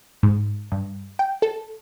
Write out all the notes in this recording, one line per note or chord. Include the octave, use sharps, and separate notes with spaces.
G#2
G2
G5
A4